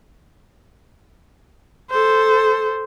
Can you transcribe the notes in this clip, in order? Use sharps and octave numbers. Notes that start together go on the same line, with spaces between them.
A4 C5